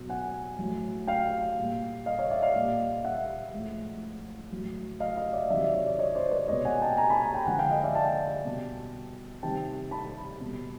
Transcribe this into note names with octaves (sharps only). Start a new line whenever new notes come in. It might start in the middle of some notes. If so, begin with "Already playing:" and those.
Already playing: B2 F#3
F#5 G#5
A2 F#3
F5 G5
A#2 G3
D#5 F5
C#5 D#5
D5 E5
D#5 F5
A#2 G3
E5 F#5
A2 F3 G#3
A2 F#3
D#5 F5
D#5 F5
D5 E5
C3 D#3 F#3 D5 E5
C#5
D5
C#5 D#5
C5 D5
B4 C#5
B2 G#3 C#5 D#5
F#5 G#5
G5 A5
G#5 A#5
A5 B5
G#5 A#5
G5 A5
D3 F3 G#3 F#5 G#5
F5 G5
D#5 F5
D5 E5
G5 A5
B2 G3
C3 D#3 G3 G5 A5
A5 B5
B2 G3